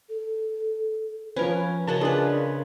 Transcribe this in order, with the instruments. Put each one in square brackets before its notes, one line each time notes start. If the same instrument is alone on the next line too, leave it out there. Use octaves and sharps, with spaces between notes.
[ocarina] A4
[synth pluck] F3 B4 [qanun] C#4 A#4
[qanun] C#3 F#4 D#5 [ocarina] A#4 [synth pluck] A5
[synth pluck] D4 G#4 [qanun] F4 B4